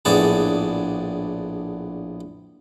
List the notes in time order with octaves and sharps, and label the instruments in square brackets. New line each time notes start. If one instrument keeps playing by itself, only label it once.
[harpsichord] A#1 A2 B3 D4 G#4 A5